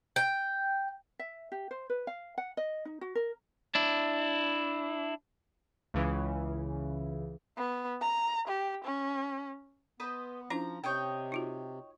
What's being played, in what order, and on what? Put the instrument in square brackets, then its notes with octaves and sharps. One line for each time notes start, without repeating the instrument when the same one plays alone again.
[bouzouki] G5
[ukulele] E5
G4
C5
B4
F5
F#5
D#5
D#4
F#4
A#4
[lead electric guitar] D4 E4
[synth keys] C#2 C#3 E3
[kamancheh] B3
A#5
G4
C#4
[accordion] B3 [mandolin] B4 C5 D#5
[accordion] F3 [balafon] C#4 D4 E4 [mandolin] A#5
[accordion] C3 [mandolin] C#5 D#5 G5
[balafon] D#4 F4 F#4